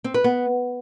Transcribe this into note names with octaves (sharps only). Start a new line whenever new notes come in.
C4
B4
B3